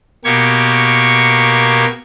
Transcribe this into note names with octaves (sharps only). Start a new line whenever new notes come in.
B2 A#3 G4 C#6 G#6